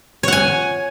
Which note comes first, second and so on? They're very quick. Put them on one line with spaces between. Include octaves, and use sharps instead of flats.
C#5 F#5 G#5